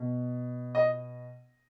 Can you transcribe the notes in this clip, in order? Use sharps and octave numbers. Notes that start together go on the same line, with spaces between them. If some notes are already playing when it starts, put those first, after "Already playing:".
Already playing: B2
D#5